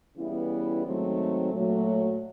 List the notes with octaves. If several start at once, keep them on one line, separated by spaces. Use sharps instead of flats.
C#3 E3 G3 B3 E4
G#2 D#3 F#3 A3 C4
A#2 F#3 A3